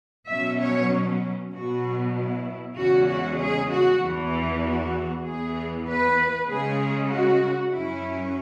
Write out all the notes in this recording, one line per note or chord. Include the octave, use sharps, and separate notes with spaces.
B2 F#3 C#4 E5
C#5
B2 F#3 B3 F#4
E4
E2 C#3 G#3 C#4 F#4
F#4
G#4
F#4
E2 E3 B3
F#4
E2 E3 B3 G#4
B4
C#3 G#3 C#4 G#4
F#4
F#2 F#3 C#4 E4